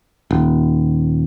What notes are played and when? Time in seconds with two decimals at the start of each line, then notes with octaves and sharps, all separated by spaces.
0.31 D#1